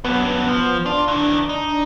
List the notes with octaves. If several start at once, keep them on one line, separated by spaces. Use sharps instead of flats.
G2 F#3 B3
F3
D4 F4
D#3 E3
D#4